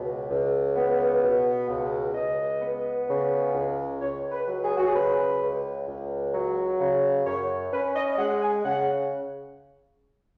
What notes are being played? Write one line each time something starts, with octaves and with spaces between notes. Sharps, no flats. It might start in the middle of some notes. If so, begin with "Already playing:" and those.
Already playing: C#2 B2
C#2
B3
B2
C#2
C#2 D#5
B3
C#3
C#2
C#2 C#5
B4
F#3
G#4
F#4
G#4
C#3 B4
C#2
C#2
F#3
C#3
F#2 C#5
C#4 B4
D#5
D#5
G#3 F#5
G#5
C#3 F#5